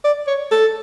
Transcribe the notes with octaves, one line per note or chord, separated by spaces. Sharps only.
D5
C#5
A4